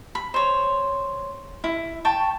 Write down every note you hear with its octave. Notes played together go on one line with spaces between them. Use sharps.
B5
C5 C#5
E4
G5 A5 C#6